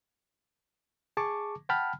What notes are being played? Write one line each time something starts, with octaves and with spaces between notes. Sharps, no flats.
G#4 A5 C#6 D6
F#5 G5 A5 B5 F6